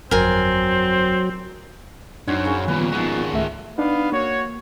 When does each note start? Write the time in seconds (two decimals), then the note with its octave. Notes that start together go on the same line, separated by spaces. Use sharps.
0.11 G1 F2 F#3 C4 A#4 G#5
2.28 F#2 C4 D4 D#4 F#4 C#5
2.45 C#3 C#4
2.68 D#2 A#2 F3 B3 F4 B4
2.92 A#2 D#3 G#3 F#4
3.32 C#2 A3 E5
3.78 B3 D4 D#4 B4 F5
4.12 A#3 F#4 C#5